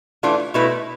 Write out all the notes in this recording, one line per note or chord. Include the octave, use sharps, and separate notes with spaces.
E3 A3 D4 F4
B2 A3 E4 B4